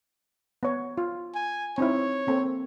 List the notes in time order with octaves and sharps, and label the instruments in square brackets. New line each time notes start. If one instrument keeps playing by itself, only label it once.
[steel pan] B3 C#5
F4
[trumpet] G#5
[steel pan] C4 D#4 E4 [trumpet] C#5
[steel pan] A#3 C4 A4